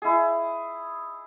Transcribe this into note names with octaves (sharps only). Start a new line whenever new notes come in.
E4 G#4